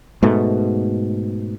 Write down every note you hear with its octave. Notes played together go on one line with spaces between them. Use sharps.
G#2 B2 A3